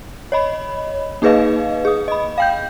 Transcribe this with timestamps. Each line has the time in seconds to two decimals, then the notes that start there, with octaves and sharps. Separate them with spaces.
0.32 C#5 D#5 B5
1.22 A#3 D#4 G#4 B4 D#5 F5
1.85 G#4 D#6
2.08 D#5 B5
2.38 F5 G5 G6